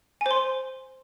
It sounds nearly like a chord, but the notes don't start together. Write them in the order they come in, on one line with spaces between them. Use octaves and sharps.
G#5 C5 C6